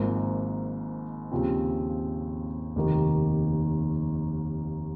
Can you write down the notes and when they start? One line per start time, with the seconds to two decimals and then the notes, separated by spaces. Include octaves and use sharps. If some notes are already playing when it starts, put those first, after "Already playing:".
Already playing: G#1 G#2 F3 A#3
1.31 D#2 C#3 F3 C4
2.76 F1 D#2 D#3 A#3